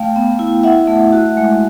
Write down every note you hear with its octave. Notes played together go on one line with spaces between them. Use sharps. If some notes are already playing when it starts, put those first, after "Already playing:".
Already playing: A3 F5 G5
B3
E4
E4 E5 F#5
A3
F#4
G#3